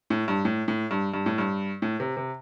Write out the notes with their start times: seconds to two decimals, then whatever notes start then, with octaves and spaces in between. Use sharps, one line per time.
0.10 A2
0.28 G2
0.45 A2
0.68 A2
0.91 G2
1.14 G2
1.26 A2
1.38 G2
1.82 A2
2.00 C3
2.17 C3